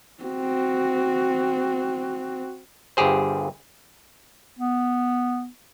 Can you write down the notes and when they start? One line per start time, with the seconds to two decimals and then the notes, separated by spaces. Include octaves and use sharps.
0.23 C4 F#4
2.97 G1 G2 G4 G#4 C5
4.59 B3